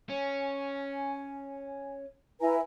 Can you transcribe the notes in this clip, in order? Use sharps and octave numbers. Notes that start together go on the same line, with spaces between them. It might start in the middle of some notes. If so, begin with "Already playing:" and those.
C#4 G#5
E4 B4 G#5 A#5